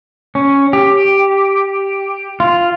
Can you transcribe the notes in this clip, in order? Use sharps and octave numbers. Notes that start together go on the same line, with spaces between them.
C#4
G4
F4